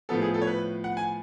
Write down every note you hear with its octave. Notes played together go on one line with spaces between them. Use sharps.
A2 F3 B3 A4
G#4
A4
C#5
B4
F#5
G#5